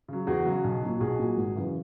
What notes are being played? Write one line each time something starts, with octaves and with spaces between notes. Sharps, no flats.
C#3 F#3
E2 F#4 G#4
C#3 F#3
B1
A#2 F#3
B1 F#4 G#4
A#2 F#3
G#1
F#2 C#3 E3